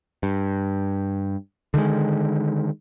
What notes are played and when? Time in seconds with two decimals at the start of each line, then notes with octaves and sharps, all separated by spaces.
0.23 G2
1.74 D3 D#3 G3 G#3